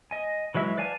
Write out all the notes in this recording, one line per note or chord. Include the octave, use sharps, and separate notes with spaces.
D#5 G#5
E3 F#3 G#3 E5
B4 D5 F5 G#5 A5